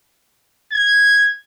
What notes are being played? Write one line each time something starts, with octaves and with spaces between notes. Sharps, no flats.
G#6